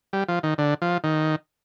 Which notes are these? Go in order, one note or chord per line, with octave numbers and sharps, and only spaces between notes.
G3
F3
D#3
D3
F3
D#3